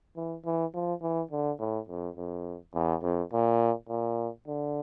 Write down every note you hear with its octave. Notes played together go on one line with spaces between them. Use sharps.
E3
E3
F3
E3
D3
A2
F2
F2
E2
F2
A#2
A#2
D3